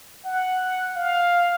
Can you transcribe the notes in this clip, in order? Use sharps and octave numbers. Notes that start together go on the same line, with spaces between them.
F#5
F5